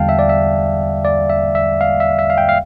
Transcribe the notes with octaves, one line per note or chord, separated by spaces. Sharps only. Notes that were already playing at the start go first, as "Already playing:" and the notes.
Already playing: E2 D3 G3 F5 G5 A5
E5
D5
E5
D5
E5
E5
F5
E5
E5
F5
G5
F5